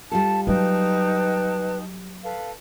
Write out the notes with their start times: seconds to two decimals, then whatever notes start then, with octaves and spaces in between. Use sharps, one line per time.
0.12 G3 F4 A4 A5
0.47 F#3 D#4 B4 G5 A5
2.23 A4 B4 F5